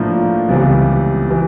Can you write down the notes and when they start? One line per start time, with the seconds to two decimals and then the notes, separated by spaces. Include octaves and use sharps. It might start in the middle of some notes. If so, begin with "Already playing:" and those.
Already playing: A2 F3 A#3 D4
0.49 C#2 C3 E3 G3 B3
1.31 E3